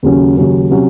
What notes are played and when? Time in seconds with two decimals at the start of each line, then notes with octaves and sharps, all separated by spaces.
0.03 D#2 C#3 F#3 C#4
0.37 D#2 C#3 F#3 C#4
0.71 C3 F#3 C#4